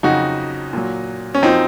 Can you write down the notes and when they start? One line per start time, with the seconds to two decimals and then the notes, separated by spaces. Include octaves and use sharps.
0.03 F2 C#3 F#3 D#4 F#4
0.73 A#2 F#3
1.35 C#4
1.42 F#2 F3 C4 D#4